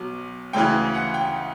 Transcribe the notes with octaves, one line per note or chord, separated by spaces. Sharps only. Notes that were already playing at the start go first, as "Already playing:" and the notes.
Already playing: B1 B2 F#3
D2 C#3 E3 G5
F#5
G5